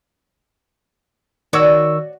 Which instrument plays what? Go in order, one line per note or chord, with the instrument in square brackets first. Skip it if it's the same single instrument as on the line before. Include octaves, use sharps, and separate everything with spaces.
[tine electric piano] D#3 C#6 E6 [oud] F#4 C#5 D5